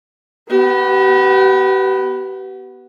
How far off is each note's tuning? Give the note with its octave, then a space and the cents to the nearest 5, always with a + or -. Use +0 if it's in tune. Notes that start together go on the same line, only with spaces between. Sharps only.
B3 +0 G4 -35